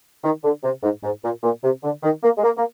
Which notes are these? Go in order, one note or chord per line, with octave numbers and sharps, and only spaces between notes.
D#3
D3
C3
G#2
G#2
A#2
A#2
C3
D3
D#3
A#3
G#3
A#3
A#3